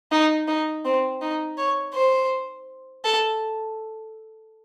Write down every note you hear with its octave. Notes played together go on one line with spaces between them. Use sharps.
D#4
D#4
C4
D#4
C#5
C5
A4